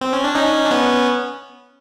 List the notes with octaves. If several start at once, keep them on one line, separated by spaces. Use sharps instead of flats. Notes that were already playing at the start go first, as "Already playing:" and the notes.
C4
C#4
D4
C#4 D#4
D4
B3 C#4